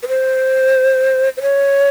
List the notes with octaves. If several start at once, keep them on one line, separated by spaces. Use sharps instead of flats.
B4
C5
C5
C#5